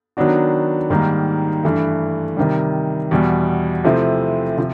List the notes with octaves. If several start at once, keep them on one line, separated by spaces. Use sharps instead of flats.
D#3 F#3 B3 D4 F#4
G#2 D#3 G3 A#3
G2 E3 A3
C3 D#3 G3
E2 B2 G3
C3 F3 A3 C4 E4
C3 F3